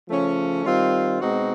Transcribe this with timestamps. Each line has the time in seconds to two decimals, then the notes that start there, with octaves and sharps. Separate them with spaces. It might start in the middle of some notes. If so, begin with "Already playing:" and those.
0.10 C#3 F3 A3 C#4
0.65 D#3 G3 C4 F4
1.20 B2 G#3 C4 D#4 F#4